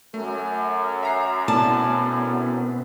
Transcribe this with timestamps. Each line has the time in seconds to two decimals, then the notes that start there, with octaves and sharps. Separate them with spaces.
0.14 F#2 A3
1.03 E5 A#5 C7
1.48 B2 A3 B3 C4 E4 D5 A5